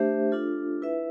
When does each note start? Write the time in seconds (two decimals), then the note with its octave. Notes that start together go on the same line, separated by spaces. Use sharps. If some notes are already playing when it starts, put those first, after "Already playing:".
Already playing: A3 D4 G4 C5 E5
0.32 D4 F4 A4
0.82 E4 B4 E5